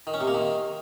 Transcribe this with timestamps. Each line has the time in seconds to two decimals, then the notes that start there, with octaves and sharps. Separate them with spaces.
0.07 D#3
0.14 C#4
0.21 C3
0.27 A#3
0.34 D#3